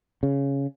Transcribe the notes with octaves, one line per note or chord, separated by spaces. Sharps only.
C#3